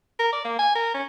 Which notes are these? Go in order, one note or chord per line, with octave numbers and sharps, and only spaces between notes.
A#4
D5
A#3
G#5
A#4
C#4